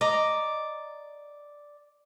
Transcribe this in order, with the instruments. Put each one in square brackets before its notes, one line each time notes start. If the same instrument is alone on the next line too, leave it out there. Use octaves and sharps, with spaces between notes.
[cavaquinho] D5 A#5 [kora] D#5